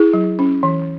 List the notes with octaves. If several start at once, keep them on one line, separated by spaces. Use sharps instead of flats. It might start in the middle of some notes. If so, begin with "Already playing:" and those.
Already playing: E4 G#4
F#3
C#4
E3